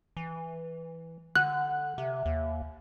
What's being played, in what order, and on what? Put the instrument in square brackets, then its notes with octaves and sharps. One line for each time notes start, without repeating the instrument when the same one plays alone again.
[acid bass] E3
[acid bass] D3 [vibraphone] F#5 [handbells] F#6
[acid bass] C3 [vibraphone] E5
[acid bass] D#2